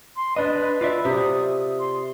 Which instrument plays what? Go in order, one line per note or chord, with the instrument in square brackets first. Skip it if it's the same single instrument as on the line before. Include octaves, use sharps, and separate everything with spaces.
[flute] C6
[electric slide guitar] D4 D#5 [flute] B4
[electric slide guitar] F4 D5 E5
[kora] C3 [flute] D#6
[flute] C6